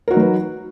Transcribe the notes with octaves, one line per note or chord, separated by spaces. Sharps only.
F#3 D#4 F#4 A#4 B4